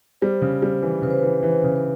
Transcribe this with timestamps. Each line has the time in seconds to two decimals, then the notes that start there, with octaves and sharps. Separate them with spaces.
0.22 G3 C5
0.42 C#3
0.62 G3
0.82 E3
1.02 C#3 B4
1.10 C5
1.18 E3 B4
1.43 E3
1.63 C#3
1.76 B4